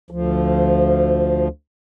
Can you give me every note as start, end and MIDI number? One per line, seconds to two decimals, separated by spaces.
0.11 1.48 38
0.11 1.48 53